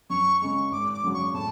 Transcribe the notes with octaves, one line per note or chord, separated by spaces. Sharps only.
F#2 C#6
C#3 G#3 C#6
G#1 D6
D6
F#2 C#3 F#3
C#6
A2 A5